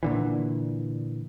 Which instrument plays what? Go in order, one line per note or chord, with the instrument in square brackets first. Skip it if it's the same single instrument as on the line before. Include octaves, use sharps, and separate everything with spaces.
[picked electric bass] A#2 D3 E3